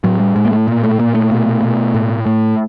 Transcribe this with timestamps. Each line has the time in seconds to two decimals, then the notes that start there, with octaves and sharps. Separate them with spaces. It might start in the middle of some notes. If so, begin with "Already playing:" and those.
0.04 A2 F#3
0.20 G3
0.36 A2 G#3
0.45 A#3
0.52 A3
0.68 A#2 A#3
0.84 A3
0.99 A#2 A#3
1.14 A3
1.31 B2
1.63 B2
1.94 A2
2.26 A2